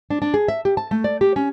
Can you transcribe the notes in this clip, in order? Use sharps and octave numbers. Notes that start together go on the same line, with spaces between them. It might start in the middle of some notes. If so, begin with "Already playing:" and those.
D4
D4
G#4
E5
G4
A5
A3
D5
G4
C#4